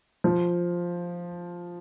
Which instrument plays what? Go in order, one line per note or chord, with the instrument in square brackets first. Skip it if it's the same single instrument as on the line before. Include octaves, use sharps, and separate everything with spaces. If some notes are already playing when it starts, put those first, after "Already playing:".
[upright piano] F3